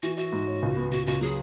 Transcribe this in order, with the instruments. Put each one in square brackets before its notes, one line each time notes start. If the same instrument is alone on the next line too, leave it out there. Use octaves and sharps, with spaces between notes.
[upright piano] E3 [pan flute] F#4
[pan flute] F#4 [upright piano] E5
[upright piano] G#2
C#5
C#2
B3
[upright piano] C#2 [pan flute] F#4
[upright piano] C#2 [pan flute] F#4
[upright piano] F#3 [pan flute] G#4